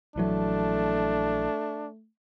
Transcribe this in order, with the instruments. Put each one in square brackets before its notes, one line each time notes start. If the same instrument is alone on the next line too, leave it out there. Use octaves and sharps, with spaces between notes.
[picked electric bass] A#1 E3 F#3 [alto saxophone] A3 [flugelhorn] D4